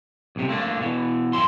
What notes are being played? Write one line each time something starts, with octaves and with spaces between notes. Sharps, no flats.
B1 C3
A3 A#3 D4
B2 E3
F#2 A#2 E4 C6